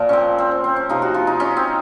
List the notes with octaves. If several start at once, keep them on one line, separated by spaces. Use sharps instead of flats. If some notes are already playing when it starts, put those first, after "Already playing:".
Already playing: A#2 F3 A#3
C4 C#4
C4
C#4
C4
C#4
C3 F3 A#3 D#4
F#4
F4
D#4
C#4
C4